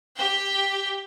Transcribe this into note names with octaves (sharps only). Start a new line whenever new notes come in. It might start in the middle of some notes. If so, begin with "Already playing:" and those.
G4 G5